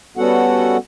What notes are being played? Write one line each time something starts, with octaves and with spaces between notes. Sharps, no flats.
G3 B3 C#4 F#4 A4 F#5